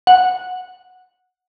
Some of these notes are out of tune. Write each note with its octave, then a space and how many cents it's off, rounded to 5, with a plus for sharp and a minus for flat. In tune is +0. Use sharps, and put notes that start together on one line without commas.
F#5 -5